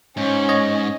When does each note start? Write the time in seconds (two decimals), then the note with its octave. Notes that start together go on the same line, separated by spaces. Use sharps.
0.17 G#2 C#4
0.49 C#5 D#5